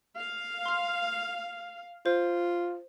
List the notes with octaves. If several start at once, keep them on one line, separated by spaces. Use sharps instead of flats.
F5
C6 F6
F4 C5